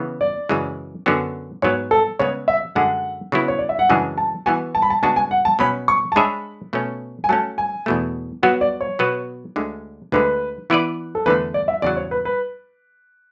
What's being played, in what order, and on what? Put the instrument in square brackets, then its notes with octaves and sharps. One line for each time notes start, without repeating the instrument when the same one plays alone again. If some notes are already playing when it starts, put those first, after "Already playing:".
Already playing: [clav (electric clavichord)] C#3 E3 B3
[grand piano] D5
[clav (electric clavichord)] F#2 C#3 E3 G#3
F#2 D3 F#3 B3 F#4
[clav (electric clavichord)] G#2 F#3 B3 [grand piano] C#5
[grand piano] A4
[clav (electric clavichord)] C#3 G#3 B3 [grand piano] C#5
[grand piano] E5
[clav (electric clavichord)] F#2 D3 G#3 D4 [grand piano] F#5
[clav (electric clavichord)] C#3 F#3 B3 E4
[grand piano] C#5
D5
E5
F#5
[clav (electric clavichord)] F#2 C#3 E3 G#3 D4 [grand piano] G#5
[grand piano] A5
[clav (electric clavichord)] E3 B3 F#4 [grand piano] G#5
[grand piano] A5
B5
A5
[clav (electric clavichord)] C#3 G#3 B3 D4 F#4 [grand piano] A5
[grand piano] G#5
F#5
A5
[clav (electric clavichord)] B2 F#3 C#4 [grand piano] B5
[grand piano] C#6
A5
[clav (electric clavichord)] G#3 D4 G#4 C#5 E5 [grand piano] B5
[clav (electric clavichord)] B2 A3 C#4
[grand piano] G#5
[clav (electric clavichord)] F#3 A3 C#4 [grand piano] A5
[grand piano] G#5
[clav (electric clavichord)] E2 B2 A3
[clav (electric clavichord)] F#3 B3 F#4 [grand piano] F#5
[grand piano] D5
C#5
[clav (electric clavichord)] B2 F#3 B3 F#4 B4
D2 D3 G#3
[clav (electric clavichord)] D2 D3 G#3 [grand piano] B4
[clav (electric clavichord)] E3 B3 E4 B4 D5
[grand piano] A4
[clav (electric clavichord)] E2 D3 A3 [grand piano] B4
[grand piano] D5
E5
[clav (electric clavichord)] E2 C#3 F#3 [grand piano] D5
[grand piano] C#5
B4
B4